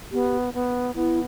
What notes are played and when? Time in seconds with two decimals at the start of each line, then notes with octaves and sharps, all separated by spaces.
0.12 B3 G4
0.54 B3
0.95 B3 E4